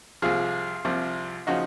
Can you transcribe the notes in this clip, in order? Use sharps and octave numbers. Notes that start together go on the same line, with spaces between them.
C2 C3 F3 F4 G#4
C2 C3 F3
C#3 F3 D#4 F#4